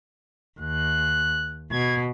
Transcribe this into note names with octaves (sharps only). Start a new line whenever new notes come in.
D#2 F#6
B2 G#6